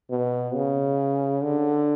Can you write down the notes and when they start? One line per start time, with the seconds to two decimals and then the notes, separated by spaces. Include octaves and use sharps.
0.10 B2
0.54 C#3
1.43 D3